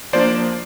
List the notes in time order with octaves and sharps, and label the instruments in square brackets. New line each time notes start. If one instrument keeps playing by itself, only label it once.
[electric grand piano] F3 A#3 D4 C5 D5